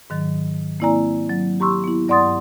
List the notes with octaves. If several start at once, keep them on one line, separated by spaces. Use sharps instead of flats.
G#2 D#3 F#3
A#3 C4 E4 D5 G#5 A#5
F#3
G4 A#5 C6 C#6 E6
B3 E4
G2 D5 F#5 C6 D#6 A6